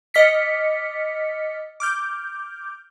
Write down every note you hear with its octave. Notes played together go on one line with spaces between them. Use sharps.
D#5 D6 F6 A6 B6 C#7
D6 F6 G6